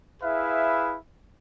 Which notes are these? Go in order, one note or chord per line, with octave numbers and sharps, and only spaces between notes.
E4 G#4 B4 E5 F5